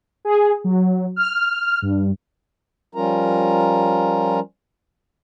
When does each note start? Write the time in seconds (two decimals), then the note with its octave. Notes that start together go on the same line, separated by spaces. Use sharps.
0.25 G#4
0.64 F#3
1.16 F6
1.82 G2
2.95 F3 G3 C#4 F4 A#4 A#5